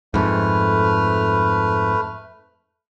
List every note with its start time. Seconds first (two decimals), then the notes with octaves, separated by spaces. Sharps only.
0.14 F2 G#2 A3 B4 F6